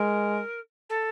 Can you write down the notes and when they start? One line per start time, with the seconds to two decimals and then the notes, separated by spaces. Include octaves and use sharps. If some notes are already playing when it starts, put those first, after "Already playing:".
Already playing: G#3 A#4
0.89 A4